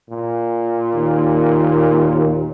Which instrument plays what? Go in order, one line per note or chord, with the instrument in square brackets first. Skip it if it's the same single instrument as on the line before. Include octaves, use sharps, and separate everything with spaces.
[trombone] A#2
[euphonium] D#2